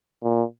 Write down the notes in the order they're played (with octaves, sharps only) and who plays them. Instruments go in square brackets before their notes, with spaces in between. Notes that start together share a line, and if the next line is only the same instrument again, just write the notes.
[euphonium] A#2